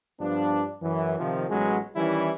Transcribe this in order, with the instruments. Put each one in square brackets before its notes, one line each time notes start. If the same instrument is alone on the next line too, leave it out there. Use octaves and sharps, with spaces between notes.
[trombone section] G2 F3 B3 D4
F#2 E3
C3 D#3 F3
A1 F#3 G#3 B3 C#4
D#3 E3 G3 C#4 E4